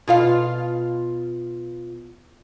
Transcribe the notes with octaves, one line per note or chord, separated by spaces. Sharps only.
B2 F4 F5